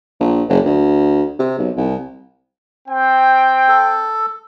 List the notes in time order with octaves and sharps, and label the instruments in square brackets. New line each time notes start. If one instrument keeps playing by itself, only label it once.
[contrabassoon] A#1
F#1
D2
C3
B1
C2
[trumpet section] C4 G5
[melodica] A4